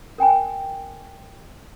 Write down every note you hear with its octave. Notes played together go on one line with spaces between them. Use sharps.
A#4 G5 G#5 A#5